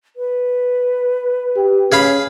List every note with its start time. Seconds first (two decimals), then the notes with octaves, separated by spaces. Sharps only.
0.16 B4
1.56 G4
1.92 C#4 G#4 F5 B5